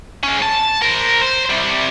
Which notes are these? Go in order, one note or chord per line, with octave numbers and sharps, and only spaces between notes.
G#3 C#4
A5
A#4 C5
C5
C3 G3